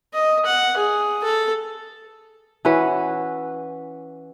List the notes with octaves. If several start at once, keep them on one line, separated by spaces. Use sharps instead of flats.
D#5
F#5
G#4
A4
E3 C#4 F#4 B4